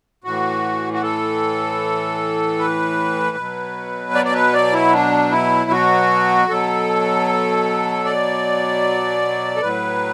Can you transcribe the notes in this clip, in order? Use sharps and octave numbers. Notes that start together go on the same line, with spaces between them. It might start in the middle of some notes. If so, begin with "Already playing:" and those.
A2 E3 F#4
F#4
A4
B4
B2 F#3
D5
D5
B4
D5
E4
D4
E4
F#4
B2 F#3 A4
D5
A4
A2 F#3 B4